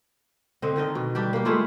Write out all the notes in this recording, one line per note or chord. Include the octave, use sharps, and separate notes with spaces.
D3 C4 D#5
D3 D#3 D#4 D#5
B2
G3 D4 G4
A#3 G4
G#3 A3 E4 F4